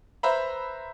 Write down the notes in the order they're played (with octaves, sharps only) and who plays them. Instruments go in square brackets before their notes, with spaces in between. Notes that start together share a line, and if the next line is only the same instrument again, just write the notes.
[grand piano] B4 C5 E5 A#5 B5